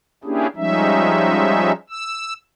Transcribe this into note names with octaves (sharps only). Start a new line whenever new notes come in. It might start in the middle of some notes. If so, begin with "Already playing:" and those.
A#3 C#4 D4 E4 G4 G#4
F3 G3 G#3 C#4 D#4 E5
E6